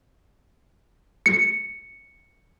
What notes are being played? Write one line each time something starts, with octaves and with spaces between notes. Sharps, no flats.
C#7